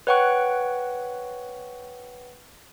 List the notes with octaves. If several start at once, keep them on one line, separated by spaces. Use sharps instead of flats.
B4 C#5 F#5 G5 C#6 F#6